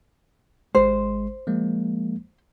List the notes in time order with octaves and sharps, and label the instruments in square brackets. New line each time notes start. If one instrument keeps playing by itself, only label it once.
[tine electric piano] G#1 G#3 C6 [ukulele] C5
[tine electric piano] F3 G#3 A#3